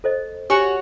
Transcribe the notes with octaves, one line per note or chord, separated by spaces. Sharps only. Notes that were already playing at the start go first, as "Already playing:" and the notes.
A4 C5 D#5
F#4 G4 C#5 G#5 C#6